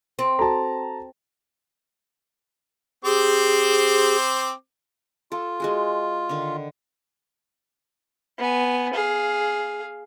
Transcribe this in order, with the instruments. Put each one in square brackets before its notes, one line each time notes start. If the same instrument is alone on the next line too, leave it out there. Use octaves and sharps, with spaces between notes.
[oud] C4
[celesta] F#4 A4 [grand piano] A5 A#5
[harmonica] C4 C5 D6 [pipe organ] G4 G#4
[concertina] F4 [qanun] A4
[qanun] G#3 F#4 G#4
D3 D#3
[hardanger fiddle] B3 G#5
G#4 F5